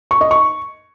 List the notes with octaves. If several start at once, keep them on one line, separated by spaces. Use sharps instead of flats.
C#6
D#5
C#6